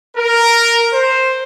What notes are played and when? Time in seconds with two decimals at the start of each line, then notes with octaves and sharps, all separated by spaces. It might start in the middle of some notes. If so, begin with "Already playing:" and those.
0.16 A#4
0.92 C5